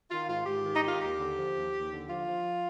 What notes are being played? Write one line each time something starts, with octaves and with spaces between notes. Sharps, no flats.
D#3 F4
G#2 F4
G#2 G4
D#3
D#4
D#3 F4
D#2 G4
D3
F3
D#2
D#2
D3
F3 F4
F3